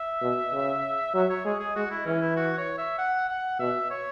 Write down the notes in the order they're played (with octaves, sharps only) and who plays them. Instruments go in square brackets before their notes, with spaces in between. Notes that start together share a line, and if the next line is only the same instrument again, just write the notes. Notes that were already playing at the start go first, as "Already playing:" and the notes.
Already playing: [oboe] E5
[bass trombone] B2
C#3
[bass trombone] F#3 [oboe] E5
[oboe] C#5
[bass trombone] G#3 [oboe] G#4
[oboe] G#4
[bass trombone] G#3 [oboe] F#4
[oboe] E4
[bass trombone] E3 [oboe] C#4
[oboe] E4
F#4
C#5
E5
F#5
F#5
[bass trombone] B2 [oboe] E5
[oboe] C#5